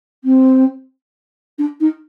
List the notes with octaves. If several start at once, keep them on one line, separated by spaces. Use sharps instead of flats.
C4
D4
D#4